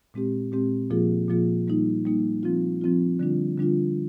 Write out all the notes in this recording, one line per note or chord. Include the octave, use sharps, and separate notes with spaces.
A#2 G#3 C4 G4
A#2 G#3 C4 G4
A#2 F3 A#3 F4 G#4
A#2 F3 A#3 F4 G#4
G3 A#3 D#4
G3 A#3 D#4
F3 C4 F4
F3 C4 F4
D3 G3 D4 F4
D3 G3 D4 F4